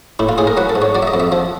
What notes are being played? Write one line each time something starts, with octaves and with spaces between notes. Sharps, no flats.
A2 E4
F4
A2 G#4
A#4
F#3 B4
A4
G#2
C#5
F#3 D5
E5
D#5
F2
E5
F3